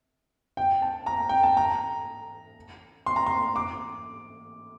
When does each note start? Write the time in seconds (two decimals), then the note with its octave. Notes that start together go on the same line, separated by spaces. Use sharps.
0.57 G5
0.82 A5
1.06 A#5
1.29 G5
1.43 A5
1.57 A#5
3.06 C6
3.16 A#5
3.26 C6
3.56 D6